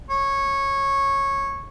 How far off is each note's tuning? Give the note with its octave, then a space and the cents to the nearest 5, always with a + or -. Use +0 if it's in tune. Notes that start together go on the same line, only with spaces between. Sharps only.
C#5 -10